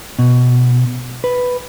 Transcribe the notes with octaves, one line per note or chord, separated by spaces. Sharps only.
B2
B4